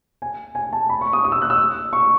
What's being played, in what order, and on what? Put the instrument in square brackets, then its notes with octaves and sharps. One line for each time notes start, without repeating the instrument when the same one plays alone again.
[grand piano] G#5
G#5
A5
B5
C#6
D#6
D#6
E6
F#6
E6
C#6